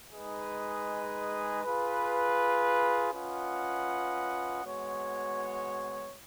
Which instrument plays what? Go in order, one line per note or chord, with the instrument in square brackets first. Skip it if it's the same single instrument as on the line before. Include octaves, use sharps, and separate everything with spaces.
[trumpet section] G#3 D#4 G#4 B4 D#5
F4 G#4 B4
C#4 F4 B4 D#5 F#5
G#3 B3 F#4 C#5